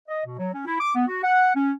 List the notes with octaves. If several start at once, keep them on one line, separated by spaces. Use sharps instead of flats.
D#5
B2
F#3
C#4
E4
D6
B3
F#4
F#5
C#4